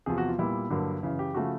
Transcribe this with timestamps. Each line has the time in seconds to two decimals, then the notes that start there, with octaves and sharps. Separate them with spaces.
0.06 E2 C3 F3 G#4
0.18 F#4
0.28 F4
0.38 A#2 G3 B3 E4
0.70 G2 D3 F#3 A#3
1.03 F#2 C#3 E3
1.19 G4
1.34 C#3 F3 A3 F#4